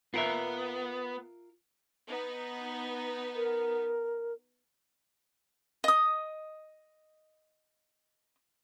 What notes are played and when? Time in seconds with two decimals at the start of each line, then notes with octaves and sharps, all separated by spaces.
0.14 B3 F4 A#4 E5
2.06 B3 D#4
3.36 A#4
5.84 D#5 D#6